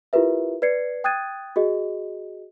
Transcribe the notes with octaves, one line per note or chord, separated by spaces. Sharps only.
E4 F4 G4 A#4 B4 E5
B4 D5 G#6 C7 C#7
G5 D#6 F#6 G#6 A6 D#7
F#4 G#4 D#5